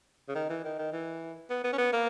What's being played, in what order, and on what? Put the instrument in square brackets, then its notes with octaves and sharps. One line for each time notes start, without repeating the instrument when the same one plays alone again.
[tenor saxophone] C#3
D#3
E3
D#3
D#3
E3
B3
B3
C#4
B3
A#3